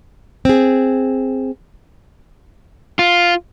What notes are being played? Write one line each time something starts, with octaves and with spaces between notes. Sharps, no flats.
C4 G#4
F4